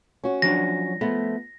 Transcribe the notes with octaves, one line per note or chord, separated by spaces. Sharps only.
C#4 F#4
F3 F#3 D4 A#6
F3 A3 B3